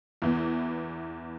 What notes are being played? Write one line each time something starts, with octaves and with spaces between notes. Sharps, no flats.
E2 E3 B3